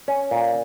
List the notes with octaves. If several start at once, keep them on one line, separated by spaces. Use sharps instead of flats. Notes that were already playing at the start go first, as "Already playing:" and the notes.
C#4
A#2